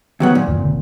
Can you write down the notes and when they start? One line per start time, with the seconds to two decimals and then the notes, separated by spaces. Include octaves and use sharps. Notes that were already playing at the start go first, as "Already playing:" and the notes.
0.20 D#2 F#3 B3
0.35 A#2
0.48 F#2 D#3
0.60 F1 D3 C4